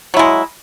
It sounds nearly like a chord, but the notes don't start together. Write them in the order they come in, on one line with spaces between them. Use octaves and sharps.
F#3 E4 G#3